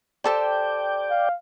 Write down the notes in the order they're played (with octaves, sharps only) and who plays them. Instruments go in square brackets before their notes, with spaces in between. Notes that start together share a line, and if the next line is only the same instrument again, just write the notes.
[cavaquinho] G4 A4 C5 [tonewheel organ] D5 G5
[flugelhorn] F5